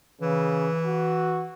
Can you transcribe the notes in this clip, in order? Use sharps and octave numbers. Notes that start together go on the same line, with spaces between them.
C#3 E3
F#4